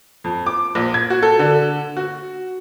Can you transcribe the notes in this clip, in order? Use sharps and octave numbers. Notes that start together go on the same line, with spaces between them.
F2
D6
A#1
G#6
F#4
A4
D3
F#4